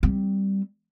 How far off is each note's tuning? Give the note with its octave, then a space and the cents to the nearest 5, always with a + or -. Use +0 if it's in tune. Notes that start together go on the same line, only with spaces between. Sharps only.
G3 -5 C4 +0